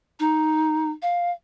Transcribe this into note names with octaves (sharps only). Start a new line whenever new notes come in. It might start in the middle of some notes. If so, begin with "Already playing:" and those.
D#4
F5